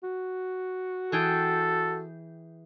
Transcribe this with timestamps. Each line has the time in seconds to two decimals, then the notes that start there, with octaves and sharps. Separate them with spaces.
0.03 F#4
1.12 E3 G#4 A4 G5